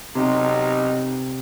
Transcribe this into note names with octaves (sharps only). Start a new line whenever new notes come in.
B1 C3 D#4